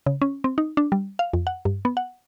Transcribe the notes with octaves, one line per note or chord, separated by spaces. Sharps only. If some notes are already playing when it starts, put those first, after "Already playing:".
C#3
C#4
C4
D#4
D4
G3
F5
F2
F#5
G2
B3
F#5